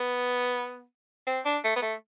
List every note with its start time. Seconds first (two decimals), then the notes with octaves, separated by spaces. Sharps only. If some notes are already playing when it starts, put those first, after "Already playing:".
Already playing: B3
1.27 C4
1.45 D4
1.64 A3
1.76 B3
1.82 A3